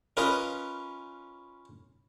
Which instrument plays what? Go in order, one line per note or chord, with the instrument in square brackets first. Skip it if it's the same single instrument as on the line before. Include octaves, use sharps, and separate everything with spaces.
[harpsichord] C#4 F4 A#4 B4 D#5